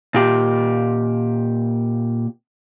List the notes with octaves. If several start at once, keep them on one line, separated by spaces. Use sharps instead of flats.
A#2 G4